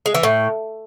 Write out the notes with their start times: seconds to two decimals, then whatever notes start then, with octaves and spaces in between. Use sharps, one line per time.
0.06 G#3
0.14 E3
0.23 A2